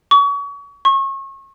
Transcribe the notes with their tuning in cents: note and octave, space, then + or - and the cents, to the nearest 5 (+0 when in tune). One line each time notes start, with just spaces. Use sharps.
C#6 +35
C#6 -30